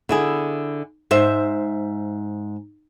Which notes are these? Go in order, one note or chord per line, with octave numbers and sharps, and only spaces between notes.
D3 E4 G#4
G#2 C5 E5